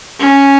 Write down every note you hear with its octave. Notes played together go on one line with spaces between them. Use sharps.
C#4